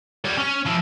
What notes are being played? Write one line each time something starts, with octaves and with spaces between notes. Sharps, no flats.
G3 C#5
C#4
F3 E4